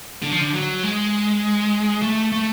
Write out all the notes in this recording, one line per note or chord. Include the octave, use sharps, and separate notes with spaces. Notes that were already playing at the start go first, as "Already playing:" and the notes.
D3
F3
D3
F#3
G#3
A3
A3